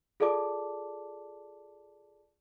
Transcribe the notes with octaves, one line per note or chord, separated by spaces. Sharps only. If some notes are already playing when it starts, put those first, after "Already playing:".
F4 G#4 A4 D5 A5 D6